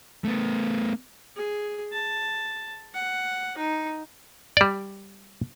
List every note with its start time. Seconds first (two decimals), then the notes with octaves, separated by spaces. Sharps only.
0.24 A3 B3
1.36 G#4
1.92 A5
2.94 F#5
3.57 D#4
4.57 G3 D5